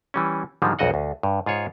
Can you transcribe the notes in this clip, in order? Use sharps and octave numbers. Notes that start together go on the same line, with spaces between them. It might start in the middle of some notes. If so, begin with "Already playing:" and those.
E3 G3 C#4
G#2 D3 D#3 F3 G3 G#3
B1 F2 F#4 D#5 F#5
D2
G2
G#2 F4 G#4 C#5